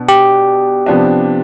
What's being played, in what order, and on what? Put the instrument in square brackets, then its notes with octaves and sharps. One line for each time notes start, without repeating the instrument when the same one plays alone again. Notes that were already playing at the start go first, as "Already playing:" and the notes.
Already playing: [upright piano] B2 B3 D4
[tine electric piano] G4
[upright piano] C3 F3 B3 D4